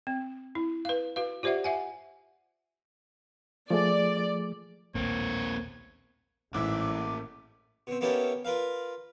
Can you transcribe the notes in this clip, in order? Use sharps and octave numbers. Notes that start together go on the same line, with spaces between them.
C4
E4
B4 F5
F#4 B4 F5
F4 G4 C5 D5 E5 F#5
E5 F#5 G#5
F3 A3 G#4 D5
A#1 D#2 A2 A#3 C4 C#5
A1 G#2 E3 A#3 E4 E5 D6
B2 C4
A#3 B3 C#4 E4 G4 A4
F4 A#4 B4 F5